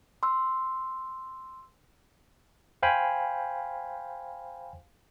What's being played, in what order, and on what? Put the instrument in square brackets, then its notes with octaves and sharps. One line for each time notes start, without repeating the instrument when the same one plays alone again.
[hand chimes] C6 E6
[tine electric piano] C5 F5 G5 G#5 B5